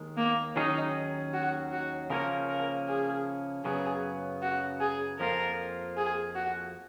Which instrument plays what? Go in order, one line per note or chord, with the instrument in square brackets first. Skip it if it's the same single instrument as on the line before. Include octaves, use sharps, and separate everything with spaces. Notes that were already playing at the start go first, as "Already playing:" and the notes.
Already playing: [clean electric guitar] D#2 D#3 G#3
[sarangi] A#3
[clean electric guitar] D#2 D#3 F#3 C#4 G#4 [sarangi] D#4
[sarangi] F#4
F#4
[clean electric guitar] C#3 F3 A#3 C#4 [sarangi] A#4
[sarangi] A#4
G#4
[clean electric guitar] F#2 C#3 F#3 B3 [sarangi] G#4
[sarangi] F#4
G#4
[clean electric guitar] F2 F3 A#3 F4 [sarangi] A#4
[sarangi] G#4
F#4